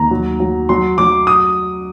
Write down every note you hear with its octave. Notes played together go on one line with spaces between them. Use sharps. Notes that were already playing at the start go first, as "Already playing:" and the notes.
Already playing: D#2 A#5
F#3
F#3
F#3 C6
F#3 D6
D#6